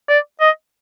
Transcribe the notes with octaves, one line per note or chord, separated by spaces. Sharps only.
D5
D#5